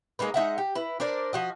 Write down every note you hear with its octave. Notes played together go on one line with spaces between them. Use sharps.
G#3 A#3 D#4 B4
G#3 D#4 E5 F#5
G4
E4 B4
D4 A#4 C5 D5
F3 F#4 D#5